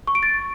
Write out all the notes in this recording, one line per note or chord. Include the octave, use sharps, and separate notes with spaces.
C#6
D7
A6